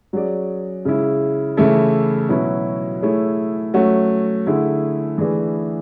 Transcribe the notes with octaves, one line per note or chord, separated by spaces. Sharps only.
F#3 C#4 G#4 D5
C#3 G#3 C#4 E4
C#3 E3 A3 E4 A4
B2 F#3 C#4 E4 B4
A3 E4 G#4 C#5
F#3 A3 C#4 F#4
D3 A3 E4 G#4
E3 A3 D4 G#4 B4